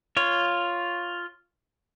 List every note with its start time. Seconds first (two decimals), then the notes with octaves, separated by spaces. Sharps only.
0.17 F4 C#5